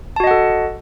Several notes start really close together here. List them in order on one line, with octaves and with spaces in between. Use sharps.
A5 F#4 D#5 F#5 A4